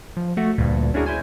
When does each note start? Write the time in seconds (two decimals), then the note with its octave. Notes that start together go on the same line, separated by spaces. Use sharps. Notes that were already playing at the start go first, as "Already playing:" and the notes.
0.17 F3
0.37 A3 F#4
0.58 D2 G2 A#2
0.94 C#4 D4 E4 F#4 G#4 A#4
1.06 E4 C5 G#5